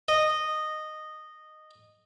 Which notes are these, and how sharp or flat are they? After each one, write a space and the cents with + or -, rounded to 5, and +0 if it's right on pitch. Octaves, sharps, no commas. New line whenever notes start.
D#5 -10